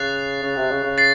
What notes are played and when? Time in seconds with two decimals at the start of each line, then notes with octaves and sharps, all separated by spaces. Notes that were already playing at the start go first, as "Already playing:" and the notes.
Already playing: C#3 F#6 A6 C7 F7
0.42 C#3
0.56 C3
0.71 C#3
0.83 C#3
0.98 A6 C7